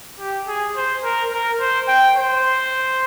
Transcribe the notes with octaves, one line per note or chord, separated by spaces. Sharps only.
G4
G#4
C5
A#4
A#4
C5
G5
C5